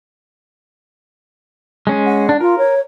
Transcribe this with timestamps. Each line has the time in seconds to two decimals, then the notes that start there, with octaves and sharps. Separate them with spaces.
1.87 G#3 C#4 G#4
2.06 F#5
2.29 D4
2.40 F4 A#4
2.58 C#5